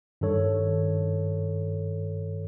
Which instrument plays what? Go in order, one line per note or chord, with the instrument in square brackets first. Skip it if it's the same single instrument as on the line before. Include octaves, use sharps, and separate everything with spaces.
[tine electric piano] G2 D#3 A4 C#5